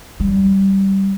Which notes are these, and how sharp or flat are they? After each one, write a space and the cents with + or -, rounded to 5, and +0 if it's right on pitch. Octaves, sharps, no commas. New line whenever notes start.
G3 -15